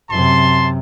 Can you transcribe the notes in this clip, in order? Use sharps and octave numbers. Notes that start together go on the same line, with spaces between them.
F#2 C3 A5 C6